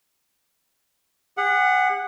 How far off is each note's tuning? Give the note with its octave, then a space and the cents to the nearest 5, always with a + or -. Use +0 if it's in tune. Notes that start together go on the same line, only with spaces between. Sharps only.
G#4 -45 F#5 +0